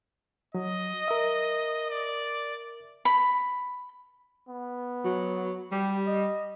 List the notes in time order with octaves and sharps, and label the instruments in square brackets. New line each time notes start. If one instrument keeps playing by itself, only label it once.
[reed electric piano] F#3 [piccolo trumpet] D#5
[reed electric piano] A#4 E5
[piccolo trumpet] D5
[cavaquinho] B5
[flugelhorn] B3
[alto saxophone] F#3
[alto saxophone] G3 [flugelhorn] G4
[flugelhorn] D#5